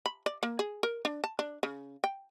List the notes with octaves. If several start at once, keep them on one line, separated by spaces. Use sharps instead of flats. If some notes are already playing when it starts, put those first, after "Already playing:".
B5
D5
A#3
G#4
A#4
D4
A5
D4
C#3
G5